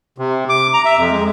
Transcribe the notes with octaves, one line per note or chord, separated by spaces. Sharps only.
C3
D6
A#5
E5
F2
G#3